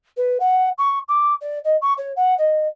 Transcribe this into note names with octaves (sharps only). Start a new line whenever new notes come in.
B4
F#5
C#6
D6
D5
D#5
C#6
C#5
F#5
D#5